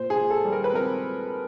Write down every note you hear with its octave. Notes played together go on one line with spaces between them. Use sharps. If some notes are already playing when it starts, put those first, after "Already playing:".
Already playing: A#2 C5
G#4
A#2
A4
G3
A#4
B4
C4 A#4